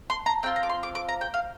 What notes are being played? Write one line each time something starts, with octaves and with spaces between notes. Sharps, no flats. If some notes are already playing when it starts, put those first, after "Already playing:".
C6
A#5
C4 F4 G5
A#5
D6
C6
D6
D6
A#5
G5
F5